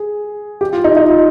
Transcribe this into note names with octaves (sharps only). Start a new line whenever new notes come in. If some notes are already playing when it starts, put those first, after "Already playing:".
Already playing: G#4
G4
F4
D#4
D#4
F4